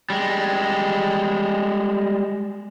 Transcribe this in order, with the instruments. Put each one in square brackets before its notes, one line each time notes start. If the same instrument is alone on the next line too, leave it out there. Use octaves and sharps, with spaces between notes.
[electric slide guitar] G3 G#3